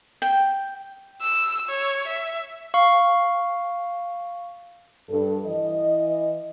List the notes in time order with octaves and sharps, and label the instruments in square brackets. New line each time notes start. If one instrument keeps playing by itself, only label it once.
[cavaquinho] G5
[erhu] E6
C#5
E5
[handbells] F5 C#6
[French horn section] G2 A4
E3 D#5